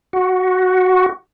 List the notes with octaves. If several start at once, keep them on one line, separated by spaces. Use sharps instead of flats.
F#4